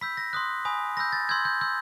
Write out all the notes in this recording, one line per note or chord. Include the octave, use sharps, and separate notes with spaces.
B5 E6 G6 B6
A#6
C6 D#6 F#6
G#5 B5 D#6
B5 E6 G6 A#6
A6
C6 E6 G6 G#6
G6
C6 E6 G6